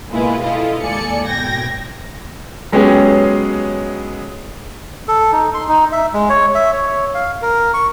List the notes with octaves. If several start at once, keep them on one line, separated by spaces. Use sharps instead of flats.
B2 G#3 A#3 E4 F4 B4
E4 F4 A4 D#5 F5
D#2 G#3 A4 D5 G#5 C#7
G#1 B2 G5 G#6 A#6
F#3 G#3 B3 C#4 G4 G#4
A4
D#4
C6
D#4
E5
G#3
C#5
E5
C#5
F5
A#4
C#6